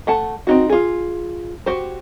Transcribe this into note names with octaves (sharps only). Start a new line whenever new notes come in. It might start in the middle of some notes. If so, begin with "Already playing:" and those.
A3 F#5 A5
C4 D#4 F#4
F4 G#4
F#4 G4 C5